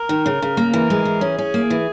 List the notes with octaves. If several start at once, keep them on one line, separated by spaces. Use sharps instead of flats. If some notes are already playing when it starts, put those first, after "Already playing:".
Already playing: A#4
D#3
C#3
C#3
A#3
E3 A#4
G#3
E3
C#4 G#4
C#4
A#3
E3